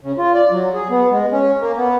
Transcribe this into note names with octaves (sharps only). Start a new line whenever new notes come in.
C#3
F4
D5
F#3
G#4
B3
G#3
C#4
A#3
B3